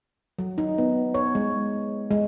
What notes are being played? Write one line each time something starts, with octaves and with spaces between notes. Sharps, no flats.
F#3
D#4
B3
C#5
G#3
G#3